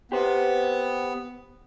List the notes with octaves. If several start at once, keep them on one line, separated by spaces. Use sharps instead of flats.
B3 G4 C5